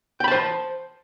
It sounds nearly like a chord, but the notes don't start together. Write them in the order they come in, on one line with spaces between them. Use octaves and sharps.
G5 B5 A5 C5